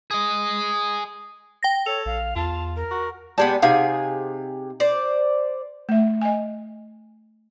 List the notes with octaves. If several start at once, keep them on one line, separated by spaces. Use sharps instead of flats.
G#4 D#5
G5 A#6
A4 C#5 F7
A#1 F5
E2 F4 A5
A#4
F#4
G3 G#3 B3 A5
C3 D#4 G#4 F5 F#5 G#5
C5 D5
A3 E5
D#5 G#5